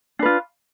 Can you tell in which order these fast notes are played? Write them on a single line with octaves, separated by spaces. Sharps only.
D4 B4 F4